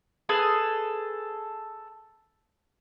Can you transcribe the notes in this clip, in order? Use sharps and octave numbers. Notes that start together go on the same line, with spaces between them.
G#4 A4 B4 G#5